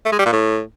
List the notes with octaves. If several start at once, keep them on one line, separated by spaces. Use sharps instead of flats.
A3
G#3
G3
A#2
A2